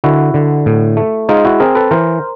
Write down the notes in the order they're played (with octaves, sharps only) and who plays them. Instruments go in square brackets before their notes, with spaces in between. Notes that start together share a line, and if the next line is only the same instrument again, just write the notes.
[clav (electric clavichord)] D3 E4 F#4
D3
A2
A3
G#3 D#4 F4
E4 F#4
C4 G#4 A#4
A4 B4
E3 A#4 C5